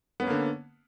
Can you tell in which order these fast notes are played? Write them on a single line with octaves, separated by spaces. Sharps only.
B3 C#4 A#3 D3